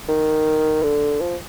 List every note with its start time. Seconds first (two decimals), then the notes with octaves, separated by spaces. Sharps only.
0.08 D#3
0.82 D3
1.20 F3